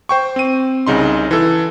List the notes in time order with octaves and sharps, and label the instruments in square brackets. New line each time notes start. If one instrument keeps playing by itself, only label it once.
[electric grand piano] C5 G5 C#6
C4 D#7
C2 C#3 D#4 C6
E3 A4